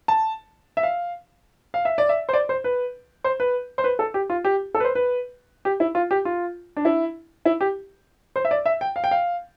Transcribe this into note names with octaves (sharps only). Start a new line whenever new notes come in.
A5
E5
F5
F5
E5
D5
E5
C5
D5
C5
B4
C5
B4
C5
B4
A4
G4
F4
G4
A4
B4
C5
B4
G4
E4
F4
G4
F4
D4
E4
E4
G4
C5
E5
D5
E5
G5
F5
G5
F5